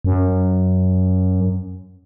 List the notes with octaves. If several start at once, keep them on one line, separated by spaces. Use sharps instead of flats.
F#2